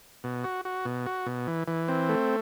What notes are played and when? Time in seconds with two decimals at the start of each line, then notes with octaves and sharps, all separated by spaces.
0.24 B2
0.44 F#4
0.65 F#4
0.85 B2
1.06 F#4
1.26 B2
1.48 E3
1.68 E3
1.88 C4
2.09 A3